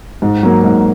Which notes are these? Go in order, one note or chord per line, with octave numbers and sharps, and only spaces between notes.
G#2
F#3 A#3
G#2